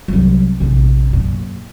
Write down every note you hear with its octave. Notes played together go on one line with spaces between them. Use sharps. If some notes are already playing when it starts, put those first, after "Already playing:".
C2 F#3
A#1 C3
F#2 A#2